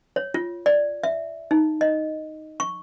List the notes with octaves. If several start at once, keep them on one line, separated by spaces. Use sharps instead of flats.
C#5
F4
D5
E5
D#4
D#5
C#6